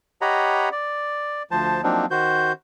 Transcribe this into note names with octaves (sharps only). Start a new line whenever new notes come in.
G4 C#5 D#5 F#5 A#5 B5
D5
D2 F3 C5 A5
F3 F#3 A#3 C4 D4 D#4
D#3 F#4 C5 G6